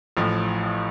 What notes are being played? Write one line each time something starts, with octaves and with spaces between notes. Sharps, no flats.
A1 A2 F3